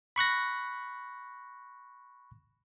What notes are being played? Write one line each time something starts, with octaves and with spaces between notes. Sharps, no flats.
B5 C#6 F#6 A#6